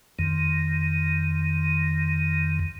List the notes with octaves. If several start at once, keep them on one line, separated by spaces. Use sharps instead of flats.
F2 D#3